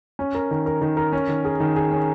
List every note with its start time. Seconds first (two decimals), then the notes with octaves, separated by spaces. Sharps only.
0.19 C#4
0.35 A#4
0.51 D#3
0.66 A#4
0.81 D#3
0.97 A#4
1.13 C#4
1.29 D#3
1.45 G#4
1.60 D#3
1.76 G#4
1.91 C#4